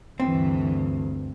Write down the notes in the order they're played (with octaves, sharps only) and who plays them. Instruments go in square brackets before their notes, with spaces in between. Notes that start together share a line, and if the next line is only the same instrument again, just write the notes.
[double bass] D2 G2 [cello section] E3 [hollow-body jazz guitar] C4